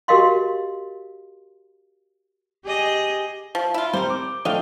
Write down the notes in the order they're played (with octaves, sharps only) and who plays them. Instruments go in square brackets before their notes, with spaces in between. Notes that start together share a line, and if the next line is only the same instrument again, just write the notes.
[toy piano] F#4 G4 A#4 D#5 F5 C6
[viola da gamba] G4 G#4 D#5
[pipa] F3
E4 F4
[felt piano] G3 C4 [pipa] A#4 C5
[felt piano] D6
[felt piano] F3 A3 D4 [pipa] D#5 F5 G5